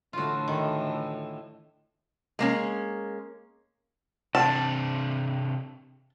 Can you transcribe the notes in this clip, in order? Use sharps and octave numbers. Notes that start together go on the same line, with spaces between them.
A2 D3 E3 F4 F#4
D#3
G#3 A#3 C#4
C3 D4 A5